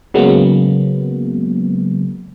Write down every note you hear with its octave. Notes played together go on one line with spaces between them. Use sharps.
C#3 F#3 G#3 A#3 B3